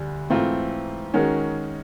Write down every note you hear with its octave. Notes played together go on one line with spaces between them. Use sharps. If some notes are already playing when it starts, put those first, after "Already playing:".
Already playing: D2 D3 G3
G#2 E3 A3 C4 F4
D#3 G#3 C#4 F#4 A#4